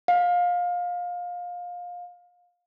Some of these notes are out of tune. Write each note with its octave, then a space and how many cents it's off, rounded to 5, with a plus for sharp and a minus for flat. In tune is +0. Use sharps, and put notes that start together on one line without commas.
F5 +25